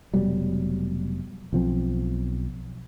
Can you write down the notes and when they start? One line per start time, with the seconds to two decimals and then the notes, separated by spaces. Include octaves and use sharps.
0.14 F1 B2 F#3 G3
1.53 B1 F3 C4